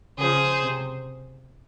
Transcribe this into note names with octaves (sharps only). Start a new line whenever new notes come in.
C#3 F3 G#4 C5
C3